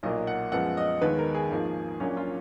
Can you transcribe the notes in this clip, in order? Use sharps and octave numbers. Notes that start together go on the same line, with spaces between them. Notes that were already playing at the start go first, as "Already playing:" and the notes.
B1 A#2 F#3 A#3 D#5
F#5
F#2 F3 G#3 B3 F#5
D#5
D#2 D#3 G#3 B3 B4
A#4
G#4
G#1 G#2 F3 A#3
A#1 A#2 F#3 A#3 C#4
F4